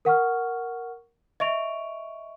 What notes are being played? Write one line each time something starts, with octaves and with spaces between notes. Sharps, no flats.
A#4 F#5 C#6 F6
D#5 E5 C#6 D7 F7